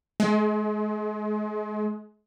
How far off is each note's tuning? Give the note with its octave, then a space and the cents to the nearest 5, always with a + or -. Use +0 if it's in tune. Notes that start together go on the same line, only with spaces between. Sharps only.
G#3 +35